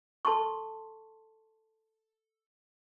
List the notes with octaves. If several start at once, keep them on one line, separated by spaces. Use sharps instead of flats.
A4 A5 C6 C#6